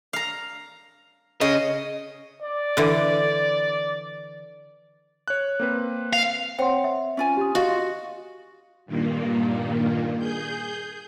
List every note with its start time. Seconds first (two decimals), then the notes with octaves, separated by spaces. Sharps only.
0.13 F5 A#5
1.41 C#3 D#5
2.42 D5
2.77 D3 E3
5.28 C#5 F#6
5.60 A#3 C4 B4
6.13 F5
6.59 C4 C5 C#5 F#5 G5 C6
6.84 E5
7.17 C#4 F4 G#5
7.37 G4 D#6
7.55 F4 F#4 D#5 F5 C#6
8.86 G2 A#2 D#3 A#3
10.19 G#4 G6